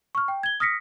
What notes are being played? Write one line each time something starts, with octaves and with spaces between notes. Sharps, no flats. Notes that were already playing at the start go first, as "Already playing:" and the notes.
C#6 F6
G5
G#6 G7
D#6 F6 A#6 B6 C#7